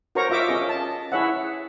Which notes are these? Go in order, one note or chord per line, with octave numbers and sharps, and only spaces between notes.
F#4 A#4 C5 C#5 A#5 C#6
F4 D#5 E5 D6
C#4 G#4 D#5
A5
E4 G#4 C#5 E5 F#5